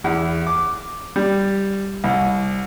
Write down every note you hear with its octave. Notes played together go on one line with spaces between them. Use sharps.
E2
D6
G3
C2